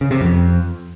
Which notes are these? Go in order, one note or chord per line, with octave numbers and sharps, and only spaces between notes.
C#3
C3
F2